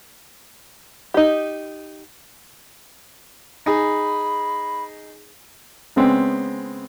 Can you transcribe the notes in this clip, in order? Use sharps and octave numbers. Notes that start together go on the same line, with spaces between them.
D#4 G4
D#4 G#4 B5
C#3 G#3 B3 C4